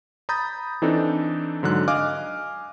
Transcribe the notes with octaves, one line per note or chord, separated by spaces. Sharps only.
A#5 B5 D#6 G6 A6
E3 C4 D4 D#4 A4
G#2 D3 F#3 F#6
D#5 F5 G#5 D6 F6